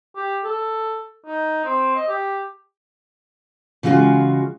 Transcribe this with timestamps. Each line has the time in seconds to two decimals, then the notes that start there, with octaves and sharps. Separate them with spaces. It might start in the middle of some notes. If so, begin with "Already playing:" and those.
0.16 G4
0.44 A4
1.26 D#4
1.65 C4
1.96 D#5
2.08 G4
3.83 C#3 E3 G#3 F4 F#4